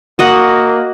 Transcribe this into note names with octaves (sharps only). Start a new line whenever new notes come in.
A#3 F#4 D#5 F#5